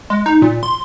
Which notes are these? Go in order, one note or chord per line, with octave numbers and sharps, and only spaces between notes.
G#3
D#4
A#2
C6